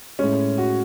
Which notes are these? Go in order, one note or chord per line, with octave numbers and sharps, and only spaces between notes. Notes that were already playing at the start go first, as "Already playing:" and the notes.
A2 G#3 C#4
F#4